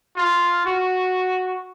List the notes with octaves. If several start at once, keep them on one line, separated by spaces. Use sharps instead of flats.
F4
F#4